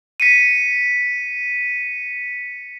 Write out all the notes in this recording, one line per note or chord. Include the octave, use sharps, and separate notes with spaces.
B6 C#7 D#7